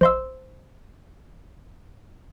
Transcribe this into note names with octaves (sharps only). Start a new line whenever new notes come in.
A#1 C5 D#5 F5 C6 E6